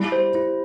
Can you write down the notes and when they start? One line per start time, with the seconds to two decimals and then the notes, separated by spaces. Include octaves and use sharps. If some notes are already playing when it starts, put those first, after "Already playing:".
Already playing: G3 E4 G4
0.12 C5
0.35 E4